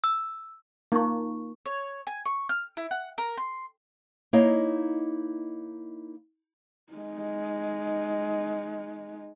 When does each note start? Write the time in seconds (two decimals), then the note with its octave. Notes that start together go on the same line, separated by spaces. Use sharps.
0.04 E6
0.92 A#3 D#4 C#6
1.66 C#5
2.07 G#5
2.25 C#6
2.49 F6
2.77 E4
2.91 F#5
3.18 A#4
3.37 C6
4.33 A#3 D#4 E4 C#5 D#5 F5
6.93 G#3 D#4